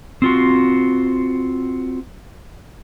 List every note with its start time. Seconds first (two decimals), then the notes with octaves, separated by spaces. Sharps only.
0.22 C4 F4 F#4